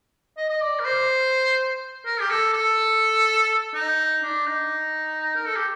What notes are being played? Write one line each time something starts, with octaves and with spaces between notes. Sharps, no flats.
D#5
D#5
D5
A#4
C5
A#4
G4
A4
A4
D#4
D4
D#4
A#4
A4
G4